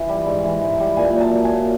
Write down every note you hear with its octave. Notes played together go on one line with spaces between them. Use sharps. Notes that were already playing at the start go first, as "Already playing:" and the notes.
Already playing: E3
G3
G#2
E3
G#2
G3
A#2 G#5
F#3
A5
F#3
G#5
A#2